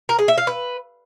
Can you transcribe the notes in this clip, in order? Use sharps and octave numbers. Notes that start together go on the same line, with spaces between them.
A#4
G#4
E5
F5
B4